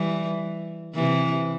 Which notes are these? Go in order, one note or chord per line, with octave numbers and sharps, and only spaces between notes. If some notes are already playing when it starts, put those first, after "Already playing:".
Already playing: E3 G3
C3 E3